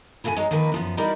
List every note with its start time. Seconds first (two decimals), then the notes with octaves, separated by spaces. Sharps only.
0.24 E4 F#4 A4 F5 G#5
0.37 F#3 G#3 D#4
0.51 D#3 F3 A#3 A#4 B4
0.72 F#2 F3 B3
0.97 G3 D#4 E4 F#4 A#4 D5